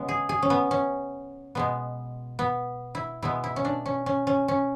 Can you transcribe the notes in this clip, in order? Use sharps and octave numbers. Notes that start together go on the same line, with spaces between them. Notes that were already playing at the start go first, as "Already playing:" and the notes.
Already playing: C#3 G#3 B3
G#4
G#4
C#4
B3
C#4
B2 G#3 B3
B3
E4
B2 G#3 B3 E4
E4
C#4
D4
C#4
C#4
C#4
C#4